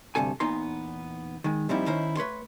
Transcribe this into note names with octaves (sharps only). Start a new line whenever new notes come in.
D2 G2 C3 A4 G#5
E2 A#2 B3 D#4 A#5 C6
D#3 G#3
A#2 F3 G3 C4 D#4 E4
D#3 C#4 D#4 E4 C5
A3 B4 C#5 C6